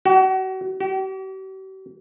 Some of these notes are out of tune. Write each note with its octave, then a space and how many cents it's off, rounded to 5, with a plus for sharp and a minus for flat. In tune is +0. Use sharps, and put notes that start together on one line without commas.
F#4 +35
G4 -45